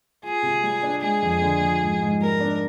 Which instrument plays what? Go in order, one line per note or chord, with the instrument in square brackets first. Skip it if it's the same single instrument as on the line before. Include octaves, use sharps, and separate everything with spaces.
[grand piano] F4 [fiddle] G#4
[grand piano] C3
G3
D4
[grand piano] G#3 [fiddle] G#4
[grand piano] F2
D3
F3
G#2
G#2
[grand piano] G3 [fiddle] A#4
[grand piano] D4